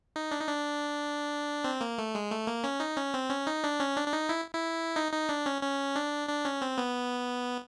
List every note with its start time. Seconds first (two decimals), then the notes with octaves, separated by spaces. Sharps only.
0.16 D#4
0.31 D4
0.40 D#4
0.48 D4
1.64 C4
1.81 A#3
1.98 A3
2.15 G#3
2.30 A3
2.47 A#3
2.64 C#4
2.80 D#4
2.97 C#4
3.14 C4
3.30 C#4
3.47 D#4
3.64 D4
3.80 C#4
3.97 D4
4.08 D4
4.13 D#4
4.29 E4
4.54 E4
4.96 D#4
5.12 D#4
5.29 D4
5.46 C#4
5.62 C#4
5.96 D4
6.29 D4
6.45 C#4
6.62 C4
6.78 B3